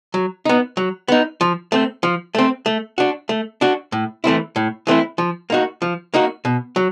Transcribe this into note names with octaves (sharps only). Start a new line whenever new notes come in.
F#3
B3 D#4
F#3
B3 D#4
F3
A3 C4
F3
A3 C4
A3
D4 F#4
A3
D4 F#4
A2
E3 A3 C4 E4
A2
E3 A3 C4 E4
F3
A#3 D#4 F#4
F3
A#3 D#4 F#4
B2
F#3